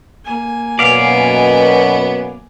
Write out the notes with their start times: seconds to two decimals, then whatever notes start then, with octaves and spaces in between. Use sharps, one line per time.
0.25 A#3 G#5
0.79 F#2 B2 B3 D5 F5